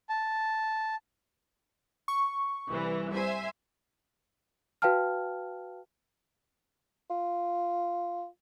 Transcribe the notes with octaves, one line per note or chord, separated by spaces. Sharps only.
A5
C#6
C2 E3
C5 E5 G#5
F#4 B4 F5 G5 A5 F6
F4